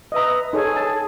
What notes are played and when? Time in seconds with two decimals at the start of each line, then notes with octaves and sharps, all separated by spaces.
0.12 B4 D#5 E5 A#5 D#6
0.53 D#4 G#4 A4 C#5 G#5
0.76 A5